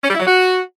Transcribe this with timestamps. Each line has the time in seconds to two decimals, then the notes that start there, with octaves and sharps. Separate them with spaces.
0.02 C#4
0.08 G3
0.14 E4
0.20 F#3
0.25 F#4